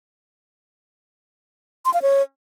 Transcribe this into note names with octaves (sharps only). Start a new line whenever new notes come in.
C6
F5
C#5